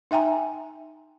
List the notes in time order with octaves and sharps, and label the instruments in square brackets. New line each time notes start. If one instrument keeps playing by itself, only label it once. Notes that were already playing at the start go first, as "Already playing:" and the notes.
[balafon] D#4 E5 G5 G#5 A#5